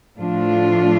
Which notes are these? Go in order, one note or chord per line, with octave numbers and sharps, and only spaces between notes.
A2 F3 A3 D4 F4